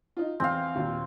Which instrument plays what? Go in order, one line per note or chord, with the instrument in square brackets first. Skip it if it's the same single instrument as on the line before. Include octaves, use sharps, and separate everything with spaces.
[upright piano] D#4 F4
[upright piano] E2 [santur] C4 F5
[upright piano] D#2 A#2